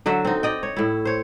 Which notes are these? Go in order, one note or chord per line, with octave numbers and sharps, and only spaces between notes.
D3 F#3 F#4 E5
C4 D#4
D5 D#5 G5
C#5
A2 E4
C5 C#5